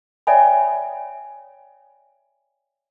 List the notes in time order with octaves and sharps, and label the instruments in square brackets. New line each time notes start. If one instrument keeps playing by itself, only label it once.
[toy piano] C#5 D5 E5 G5 G#5 B5